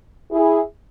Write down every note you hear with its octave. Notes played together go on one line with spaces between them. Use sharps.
E4 G#4